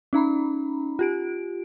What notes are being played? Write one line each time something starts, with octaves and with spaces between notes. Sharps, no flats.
C#4 D#4 A#5 B5
F4 G4 D7